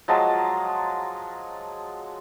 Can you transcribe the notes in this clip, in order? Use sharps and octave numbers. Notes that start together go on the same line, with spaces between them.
F3 F#3 G#3 A5